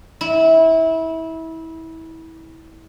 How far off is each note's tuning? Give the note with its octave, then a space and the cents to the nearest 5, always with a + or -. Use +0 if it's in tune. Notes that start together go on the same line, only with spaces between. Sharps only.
E4 -25